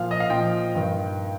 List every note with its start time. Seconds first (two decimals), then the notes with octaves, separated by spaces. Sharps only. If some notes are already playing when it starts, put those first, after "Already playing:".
Already playing: A#2 F3 F5
0.11 D#5
0.20 F5
0.30 A#2 F3 G5
0.75 G2 D#3